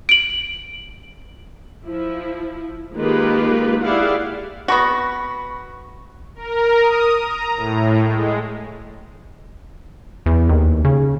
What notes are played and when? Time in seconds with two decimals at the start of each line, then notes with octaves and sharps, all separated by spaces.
0.09 D7 F#7
1.85 F3 E4
2.96 D#3 G#3 A#3 F4 G4 B4
3.82 E4 G4 G#4 D5 F5 F#5
4.68 B3 F#4 B5 C#6 A#6
6.35 A#4
6.78 D#6
7.17 A#5
7.56 A2
8.07 G#3
10.26 E2
10.49 D#2
10.85 C#3